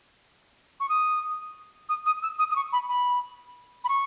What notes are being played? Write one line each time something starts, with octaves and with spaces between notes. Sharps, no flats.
C#6
D#6
D#6
D#6
E6
D#6
D#6
C#6
B5
B5
B5
C#6